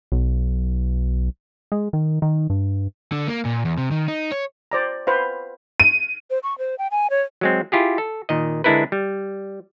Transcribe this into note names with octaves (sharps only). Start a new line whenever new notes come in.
B1
G#3
D#3
D#3
G2
D3
A#3
A#2
E2
C3
D#3
D#4
C#5
C5 D5 A#5
B4 C5 F5
D#7
C5
C#6
C5
G5
G#5
C#5
F#3 G#3 C4
E4 F4 G4 G#4
A4
A#2 D#3 D#5
D3 G#3 D4 E4 A#4 B4
G3